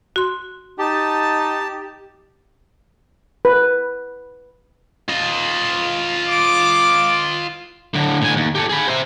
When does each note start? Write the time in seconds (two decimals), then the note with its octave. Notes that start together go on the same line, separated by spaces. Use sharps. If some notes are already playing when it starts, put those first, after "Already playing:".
0.16 F#4 C6
0.79 D#4 G4 A5
3.45 B4
5.09 F4 D#5
6.29 D6
7.94 A2 D3
8.21 A2 G#5
8.36 D#2
8.55 G4 A4
8.69 G#4 B5
8.88 C5 E5